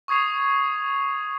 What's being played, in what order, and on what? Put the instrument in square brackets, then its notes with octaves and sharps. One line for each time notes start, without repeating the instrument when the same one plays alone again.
[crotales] C#6 D#6 G#6 C7 F7